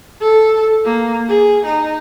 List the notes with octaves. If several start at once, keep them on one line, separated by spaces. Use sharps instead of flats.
A4
A#3
G#4
D#4